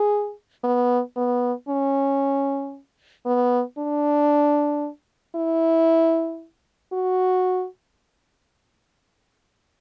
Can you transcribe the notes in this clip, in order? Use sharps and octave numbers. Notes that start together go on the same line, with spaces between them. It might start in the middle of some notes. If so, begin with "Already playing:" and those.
Already playing: G#4
B3
B3
C#4
B3
D4
E4
F#4